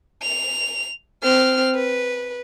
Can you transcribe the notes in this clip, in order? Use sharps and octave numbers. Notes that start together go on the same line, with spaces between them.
F7
C4 F6
B4